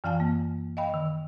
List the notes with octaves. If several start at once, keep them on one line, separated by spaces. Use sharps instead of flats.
F#2 E3 C4 F5 G#5 A5
A#3
D#5 F5 G5 B5
D#3